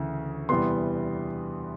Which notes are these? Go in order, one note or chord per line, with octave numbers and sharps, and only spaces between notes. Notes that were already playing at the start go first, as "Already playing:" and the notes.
Already playing: D2 C#3 E3
E2 C3 E3 G3 B3 C6